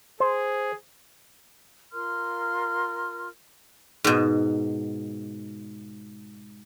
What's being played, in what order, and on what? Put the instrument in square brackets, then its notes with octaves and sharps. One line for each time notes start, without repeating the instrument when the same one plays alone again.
[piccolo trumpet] G#4 [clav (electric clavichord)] C5
[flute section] F4 A#4 C6 F6
[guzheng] G#2 B2